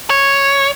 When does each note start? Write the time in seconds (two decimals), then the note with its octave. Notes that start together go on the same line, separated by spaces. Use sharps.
0.10 C#5